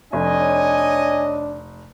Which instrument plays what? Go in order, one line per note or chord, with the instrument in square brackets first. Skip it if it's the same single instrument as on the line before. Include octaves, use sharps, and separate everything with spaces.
[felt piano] F1 [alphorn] D4 [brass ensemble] C#5 D#5 [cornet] G#5